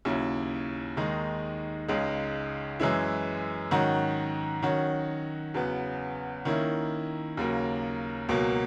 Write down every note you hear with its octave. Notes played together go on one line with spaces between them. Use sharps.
D#2 C#3 F#3 C#4 E4
D#2 D#3 G#3 D#4
C#2 C#3 G#3 D#4
F#2 E3 G#3 C#4 E4
G#2 D#3 F#3 C#4 F#4
D#3 F#3 C#4 F#4
E2 C#3 F#3 B3
D#3 A#3 C#4 E4
D#2 C#3 F#3 A#3
C#2 B2 F#3 A#3